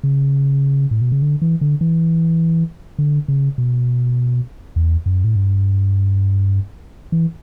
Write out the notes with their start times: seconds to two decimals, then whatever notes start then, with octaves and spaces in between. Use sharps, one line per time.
0.04 C#3
0.91 A2
1.01 B2
1.12 C#3
1.22 D3
1.42 E3
1.61 D3
1.81 E3
2.99 D3
3.28 C#3
3.58 B2
4.76 E2
5.06 F#2
5.24 A2
5.36 G2
7.12 E3